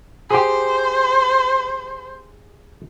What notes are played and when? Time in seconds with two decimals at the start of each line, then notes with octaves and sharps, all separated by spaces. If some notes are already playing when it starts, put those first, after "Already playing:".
0.30 G4 G#4 C5